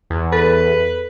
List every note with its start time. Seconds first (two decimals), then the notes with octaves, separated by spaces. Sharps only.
0.10 E2
0.33 A4 B4